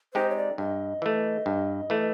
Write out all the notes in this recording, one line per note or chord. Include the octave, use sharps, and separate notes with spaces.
G#3 C4 D#4 G4 C5
C#5
D5
G2 D#5
E3 A3
G2
E3 A3